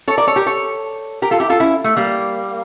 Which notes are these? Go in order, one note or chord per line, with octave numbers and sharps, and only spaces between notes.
A4 C#5
A#4 D5
A4 C#5
G4 A#4
A4 C#5
G4 A#4
F4 A4
E4 G4
F4 A4
C#4 E4
A3
G3 A#3